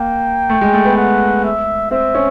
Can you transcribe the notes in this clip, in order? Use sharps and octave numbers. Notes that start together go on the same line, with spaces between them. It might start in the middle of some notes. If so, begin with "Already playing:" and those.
Already playing: A#3 G5
A3
G#3
A3
B3
F#5
E5
C4 E5
C#4